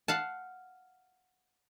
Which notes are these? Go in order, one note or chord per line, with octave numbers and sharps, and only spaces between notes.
F5 F#5 A5